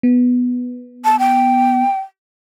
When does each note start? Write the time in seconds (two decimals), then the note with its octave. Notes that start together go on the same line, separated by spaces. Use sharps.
0.03 B3
1.05 A5
1.19 G5